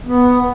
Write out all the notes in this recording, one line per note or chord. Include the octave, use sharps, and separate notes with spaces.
B3